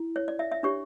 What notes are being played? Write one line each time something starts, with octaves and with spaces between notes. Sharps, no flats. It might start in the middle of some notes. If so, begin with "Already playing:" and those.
Already playing: E4
C#5
D5
E5
E5
D4 G4 C#5 C#6